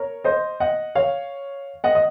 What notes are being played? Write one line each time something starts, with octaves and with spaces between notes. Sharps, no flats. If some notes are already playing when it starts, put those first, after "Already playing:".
Already playing: A#4 C#5
C5 D#5
D#5 F#5
C#5 F5
D#5 F#5
D#5